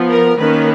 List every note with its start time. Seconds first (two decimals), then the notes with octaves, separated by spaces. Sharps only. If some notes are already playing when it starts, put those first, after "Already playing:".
Already playing: F3 B3
0.08 A#4
0.38 D#3 A#3 C#4 B4